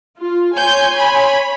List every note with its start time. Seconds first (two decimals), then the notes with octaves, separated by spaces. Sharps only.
0.17 F4
0.55 C#5 G#5 C6 G6
0.98 C#5 B5